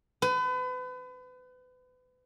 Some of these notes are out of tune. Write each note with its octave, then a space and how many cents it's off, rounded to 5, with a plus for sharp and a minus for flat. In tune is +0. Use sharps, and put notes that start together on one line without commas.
B4 +35